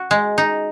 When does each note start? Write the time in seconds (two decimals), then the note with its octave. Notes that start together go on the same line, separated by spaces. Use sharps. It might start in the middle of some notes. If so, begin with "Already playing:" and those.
Already playing: F#4
0.11 G#3
0.38 D#4